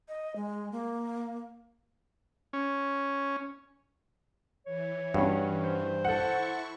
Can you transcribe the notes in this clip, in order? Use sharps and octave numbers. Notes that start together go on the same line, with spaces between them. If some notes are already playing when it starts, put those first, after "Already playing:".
D#5
G#3
A#3
C#4
E3 C#5
G2 C#4 F#4
C5
E4 A4 F#5 C#6